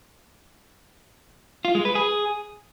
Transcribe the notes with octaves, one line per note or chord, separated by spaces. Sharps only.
F4
G#3
B4
G#4